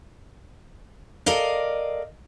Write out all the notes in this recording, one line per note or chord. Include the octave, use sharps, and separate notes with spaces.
A4 A#4 D5 D#5 F5